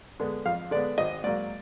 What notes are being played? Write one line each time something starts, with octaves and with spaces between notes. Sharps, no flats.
D3 G#3 B3
F2 F5
D3 G#3 B3 D5
G#1 D#5
G#2 F#3 A#3 D5